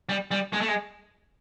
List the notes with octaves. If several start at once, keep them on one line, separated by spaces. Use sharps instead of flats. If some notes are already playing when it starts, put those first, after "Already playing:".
G3
G3
G#3
A3
G#3